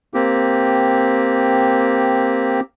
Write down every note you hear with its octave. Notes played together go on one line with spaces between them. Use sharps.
A#3 C4 G4